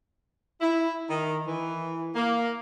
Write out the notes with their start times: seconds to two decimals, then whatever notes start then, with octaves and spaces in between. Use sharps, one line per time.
0.61 E4
1.10 D#3
1.46 E3
2.14 A#3